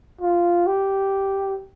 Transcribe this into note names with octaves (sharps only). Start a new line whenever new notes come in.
F4
G4